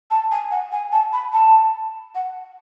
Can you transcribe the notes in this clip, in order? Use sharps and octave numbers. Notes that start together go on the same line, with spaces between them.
A5
G#5
F#5
G#5
A5
B5
A5
F#5